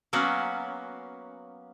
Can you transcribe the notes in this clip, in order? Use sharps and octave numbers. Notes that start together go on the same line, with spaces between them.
F#3 A#3 B3 C#4 F#4